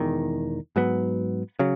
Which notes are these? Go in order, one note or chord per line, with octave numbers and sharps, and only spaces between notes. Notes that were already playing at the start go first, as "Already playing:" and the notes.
Already playing: E1 E2 D#3
G#2 F#3 B3
C#3 F#3